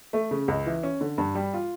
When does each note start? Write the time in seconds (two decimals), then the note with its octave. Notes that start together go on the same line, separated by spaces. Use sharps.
0.13 A3
0.31 C#3
0.48 C#2
0.66 E3
0.83 C#4
1.01 D3
1.18 G2
1.35 G3
1.54 F4